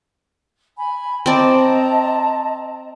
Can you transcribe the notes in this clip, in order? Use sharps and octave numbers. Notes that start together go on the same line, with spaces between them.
G#5 B5
C4 D5 D#5 A5 A#5